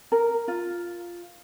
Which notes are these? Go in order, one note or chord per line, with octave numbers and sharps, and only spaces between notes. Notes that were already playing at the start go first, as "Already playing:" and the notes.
A#4
F4